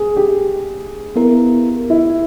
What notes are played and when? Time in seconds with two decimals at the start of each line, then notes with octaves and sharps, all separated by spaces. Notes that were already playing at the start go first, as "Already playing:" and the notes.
Already playing: G#4
0.16 G4
1.15 B3 E4 A#4
1.90 E4